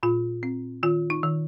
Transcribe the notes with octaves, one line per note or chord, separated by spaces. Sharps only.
A#2 F4
C4
D#3 F4
D#4
D#3